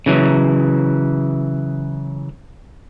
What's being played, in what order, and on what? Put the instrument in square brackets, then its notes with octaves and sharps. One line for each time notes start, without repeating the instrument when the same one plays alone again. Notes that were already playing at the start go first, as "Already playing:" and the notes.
[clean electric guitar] C#3 E3 F#3